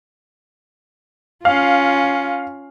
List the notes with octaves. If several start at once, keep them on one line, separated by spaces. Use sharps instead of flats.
C#4 F4 F5